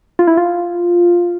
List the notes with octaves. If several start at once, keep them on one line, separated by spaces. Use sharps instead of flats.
F4
E4
F4